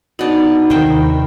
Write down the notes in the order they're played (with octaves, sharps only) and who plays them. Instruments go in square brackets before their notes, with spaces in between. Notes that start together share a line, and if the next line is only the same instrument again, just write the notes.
[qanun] B2 D4 [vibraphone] D#4
[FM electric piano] D#2 C3 B5 [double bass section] D#3 [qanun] C5 E5 G5